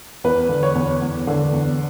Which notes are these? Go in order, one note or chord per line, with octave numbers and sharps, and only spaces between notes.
E2 B4
D3
C#5
E2
E2
D3
E2